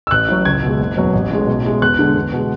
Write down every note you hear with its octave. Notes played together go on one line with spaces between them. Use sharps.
E6
A1 F#6
A2 F#3
C#2 G#6
B2 G#3
F#1
E2 B2 F#3
A1
A2 G#3
B1
A2 G#3
E2 F#6
D3 G#3
E2
B2 G#3